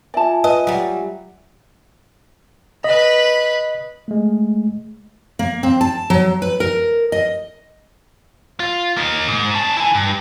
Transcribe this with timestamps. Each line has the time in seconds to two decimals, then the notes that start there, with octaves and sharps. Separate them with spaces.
0.14 F4 D5 E5 G#5 A5
0.44 B4 D#5
0.67 F#3 G3
2.84 B4 D#5 B5
4.08 G#3 A3
5.39 A#3
5.63 C4
5.81 A5
6.10 F#3
6.42 B4
6.60 A#4
7.12 D#5
8.60 F4
8.97 A#3 D#4
9.28 G#2
9.54 C#4 A5
9.77 E4 G#5
9.95 G2